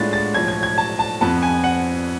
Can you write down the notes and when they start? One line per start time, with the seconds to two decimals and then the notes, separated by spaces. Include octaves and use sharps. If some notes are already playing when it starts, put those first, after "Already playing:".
Already playing: A2 G#3 B3 D4 F4 A6
0.13 A6
0.34 B1 A2 F3 G#6
0.48 G#6
0.63 G#6
0.78 A5
0.99 A5
1.21 F2 F3 B3 A5
1.43 G#5
1.64 F#5